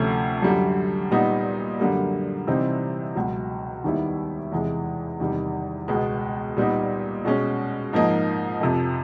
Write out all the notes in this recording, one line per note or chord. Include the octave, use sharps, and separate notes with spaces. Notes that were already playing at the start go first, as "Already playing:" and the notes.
Already playing: D2 C3 F3 A3 C#4
F#2 D3 G3
A#2 G3 B3 D#4
F#2 D3 G3 A#3
C3 E3 G3 C4 D#4
C#2 B2 F#3
D#2 D#3 G3 B3 E4
E2 C3 E3 G#3
E2 C3 D#3 G3
C#2 B2 G#3 B3
A#2 G3 B3 D#4
B2 G#3 C#4
G#2 F3 A#3 D#4
F2 C3 F3